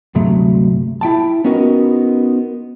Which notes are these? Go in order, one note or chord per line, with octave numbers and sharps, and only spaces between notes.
D2 G2 C3 F#3 A3
E4 G5 A5
B3 C#4 D#4 F#4 A#4